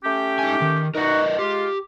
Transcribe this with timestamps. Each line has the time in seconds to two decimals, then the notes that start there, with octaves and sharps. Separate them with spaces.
0.04 A3 C#4 G4
0.39 D#4 G#5
0.62 D#3
0.95 D#4 F#4 A#4 B4 D#5
1.39 G#3 F4 G4